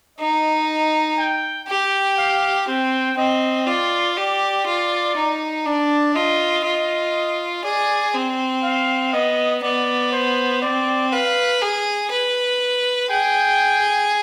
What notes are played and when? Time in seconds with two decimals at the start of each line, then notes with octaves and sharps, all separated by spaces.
0.18 D#4 D#5
1.18 G5
1.68 G4 G5
2.18 F5
2.68 C4 G5
3.17 C4 D#5
3.66 F4 D5
4.16 G4 D5
4.66 F4
5.16 D#4
5.66 D4 D5
6.15 F4 D#5
6.65 F4 D#5
7.64 G#4 D5
8.14 C4
8.63 F5
9.13 B3 D#5
9.63 B3 D5
10.12 C5
10.62 C4 D5
11.12 B4 F5
11.62 G#4
12.11 B4
13.10 G#4 G5